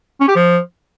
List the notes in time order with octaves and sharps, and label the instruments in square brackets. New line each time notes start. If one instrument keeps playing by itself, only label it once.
[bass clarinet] C#4
G4
F3